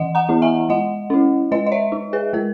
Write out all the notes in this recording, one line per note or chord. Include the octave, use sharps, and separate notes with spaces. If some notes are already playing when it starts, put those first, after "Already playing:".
Already playing: E3 D#5 F#5
F#5 A#5
B3 E4
E5 G#5
G#3 D#5 F#5
C#4 E4
G#3 B4 D#5
D#5
C#5 E5
D#4
G#4 B4
G#3 A#4